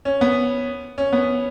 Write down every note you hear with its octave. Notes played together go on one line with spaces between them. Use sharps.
C#4
B3
C#4
B3